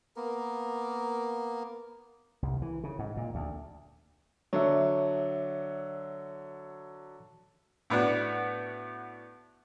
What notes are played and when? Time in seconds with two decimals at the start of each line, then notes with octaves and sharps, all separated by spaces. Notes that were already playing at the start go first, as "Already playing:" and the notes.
0.16 A#3 B3 A#4
2.42 C2
2.62 E3
2.84 C#3
2.99 G#2
3.17 A#2
3.35 D2
4.53 D3 F#3 C#5 E5
7.90 A2 B3 D4 F#4